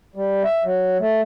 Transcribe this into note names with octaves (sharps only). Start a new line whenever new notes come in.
G3
E5
F#3
A3